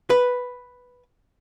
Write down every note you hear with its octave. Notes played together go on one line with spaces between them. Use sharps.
B4